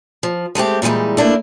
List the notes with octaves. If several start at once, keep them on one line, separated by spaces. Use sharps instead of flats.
F3
G#3 A3 C4 G4
A#2 E3 G3 G#3 D#4
A3 A#3 D4 E4